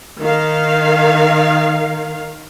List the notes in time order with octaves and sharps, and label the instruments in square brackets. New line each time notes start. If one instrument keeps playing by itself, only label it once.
[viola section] D#3 F5